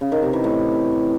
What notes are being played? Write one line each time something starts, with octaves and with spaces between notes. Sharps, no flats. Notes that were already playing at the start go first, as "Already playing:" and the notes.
C#3
D#3
C3
E3
A2